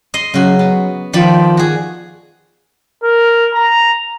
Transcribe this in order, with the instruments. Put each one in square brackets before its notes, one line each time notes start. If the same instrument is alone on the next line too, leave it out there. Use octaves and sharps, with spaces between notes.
[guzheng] D#5 C6
[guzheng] C#3 F#4 [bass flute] F#3
[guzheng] B3
[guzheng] D#3 D5 B5 [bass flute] F3
[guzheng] F#4 G#4
[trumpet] A#4
A#5